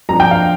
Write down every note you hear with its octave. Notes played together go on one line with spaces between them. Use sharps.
F2 F3 D4 A#5
G5
F5